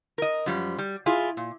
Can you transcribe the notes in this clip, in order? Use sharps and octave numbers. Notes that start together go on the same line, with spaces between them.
A#4 D#5
F#2 F3 G3
G3
E4 F4 G#4
A#2